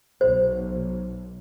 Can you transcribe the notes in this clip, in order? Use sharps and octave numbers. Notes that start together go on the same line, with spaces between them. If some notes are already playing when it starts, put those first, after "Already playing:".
B1 C5